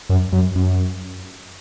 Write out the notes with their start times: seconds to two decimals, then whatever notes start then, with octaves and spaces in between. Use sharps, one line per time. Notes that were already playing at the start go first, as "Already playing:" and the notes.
0.09 F#2
0.32 F#2
0.55 F#2